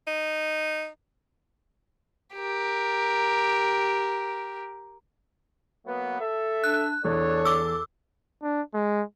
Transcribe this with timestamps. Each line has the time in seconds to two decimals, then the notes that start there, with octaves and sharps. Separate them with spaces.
0.07 D#4
2.36 G4 A#4
5.86 F#3 A#3 B3
6.20 A4 E5
6.64 D4 F#6
7.05 E2 D4 A4 C#5
7.45 D6 E6
8.43 D4
8.74 G#3